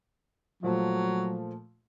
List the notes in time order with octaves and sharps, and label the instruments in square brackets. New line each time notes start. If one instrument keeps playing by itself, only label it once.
[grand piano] A#2 F3 A3 [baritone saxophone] F#3